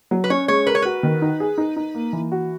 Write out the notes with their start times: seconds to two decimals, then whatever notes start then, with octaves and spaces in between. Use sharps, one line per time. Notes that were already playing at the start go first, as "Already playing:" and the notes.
0.11 F#3
0.24 B4
0.30 C#4 C#5
0.48 G#3 C#5
0.67 A#4 B4
0.75 C#5
0.82 F#4 B4
1.03 D#3
1.22 D#4
1.40 G#4
1.58 D#4
1.76 D#4
1.94 A#3
2.13 E3
2.32 F#4